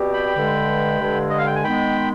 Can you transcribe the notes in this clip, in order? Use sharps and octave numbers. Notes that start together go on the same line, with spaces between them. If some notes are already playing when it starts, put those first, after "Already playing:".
Already playing: B2 G3 C4 G4
G5 B5
G2 D3 G#3
G2 D3 G#3
D#5
F5
G5
G#5
D#3 G#3 B3 G5 B5